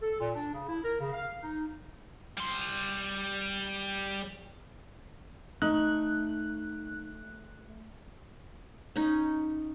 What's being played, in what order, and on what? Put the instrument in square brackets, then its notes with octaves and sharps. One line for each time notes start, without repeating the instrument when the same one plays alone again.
[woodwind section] A4
A#2
D4
C#3
E4
A#4
C#3
F5
D#4
[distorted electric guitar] G3 C6
[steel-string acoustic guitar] A3 [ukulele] D#4 [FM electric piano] F#6
[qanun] C#4 D#4